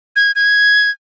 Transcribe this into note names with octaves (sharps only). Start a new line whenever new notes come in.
G#6
G#6